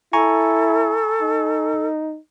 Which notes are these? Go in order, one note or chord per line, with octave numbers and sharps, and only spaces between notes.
E4 A4 G#5 A#5 C#6
D#4